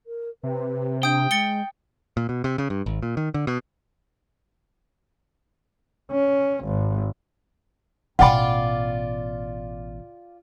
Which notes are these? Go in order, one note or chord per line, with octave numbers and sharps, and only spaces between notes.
A#4
C3 B4
D4 G5 D#6 G6
G#3 A6 C#7 G7
A#2
B2
C3
C#3
G2
G#1
A#2
D#3
D3
B2
C#4
G#1
A1 B2 F4 D5 F#5 G5 B5